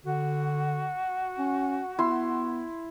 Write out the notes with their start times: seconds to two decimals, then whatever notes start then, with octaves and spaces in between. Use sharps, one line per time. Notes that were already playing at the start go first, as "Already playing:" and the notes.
0.05 D3 F#4
1.39 C#4
1.99 B3 E4 C6